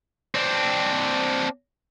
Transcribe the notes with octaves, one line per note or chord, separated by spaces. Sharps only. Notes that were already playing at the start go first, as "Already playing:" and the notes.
C4 D4